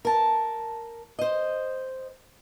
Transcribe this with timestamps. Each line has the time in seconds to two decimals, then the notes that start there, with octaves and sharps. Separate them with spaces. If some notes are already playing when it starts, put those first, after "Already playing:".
0.05 A#4 A5
1.19 C5 D#5